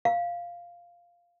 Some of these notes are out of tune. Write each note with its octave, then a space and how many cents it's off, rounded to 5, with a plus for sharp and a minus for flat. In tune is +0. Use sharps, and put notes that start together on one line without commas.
F5 -5